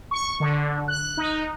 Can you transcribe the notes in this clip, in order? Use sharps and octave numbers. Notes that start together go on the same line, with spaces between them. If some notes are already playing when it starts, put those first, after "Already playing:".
C#6
D3
F#6
D#4